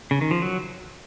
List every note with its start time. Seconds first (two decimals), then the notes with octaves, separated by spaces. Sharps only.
0.11 C#3
0.21 D#3
0.31 F3
0.42 F#3